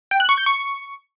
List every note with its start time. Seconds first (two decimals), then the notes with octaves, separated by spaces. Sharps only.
0.11 G5
0.20 F#6
0.29 C#6
0.38 G6
0.46 C#6